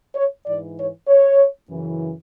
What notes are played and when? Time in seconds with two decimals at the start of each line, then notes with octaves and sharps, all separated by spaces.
0.15 C#5
0.45 G#2 E3 D5
0.76 C#5
1.07 C#5
1.69 F#2 C#3 E3